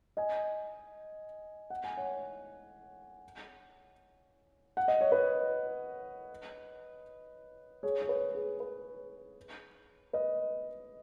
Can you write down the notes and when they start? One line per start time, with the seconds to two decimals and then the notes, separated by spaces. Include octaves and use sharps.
0.17 D#5 G#5
1.70 F#5
1.84 G#5
1.97 C#5 F#5
4.77 F#5
4.88 D#5
5.01 C#5
5.12 B4 D#5
7.83 G#4 C#5
8.02 C#5
8.09 B4
8.35 G#4
8.60 B4
10.13 B4 D#5